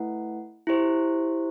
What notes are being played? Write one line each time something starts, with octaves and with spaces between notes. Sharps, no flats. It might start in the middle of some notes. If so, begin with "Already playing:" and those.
Already playing: A3 E4 B4 F#5
E4 G4 C5